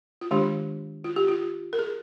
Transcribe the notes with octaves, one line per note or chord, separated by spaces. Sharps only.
F4
D#3 G#3 D4 G4
F4
G4
F4
A#4
G#4